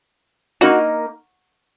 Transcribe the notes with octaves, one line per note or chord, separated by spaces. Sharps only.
A#3 D#4 F#4 A#4 D#5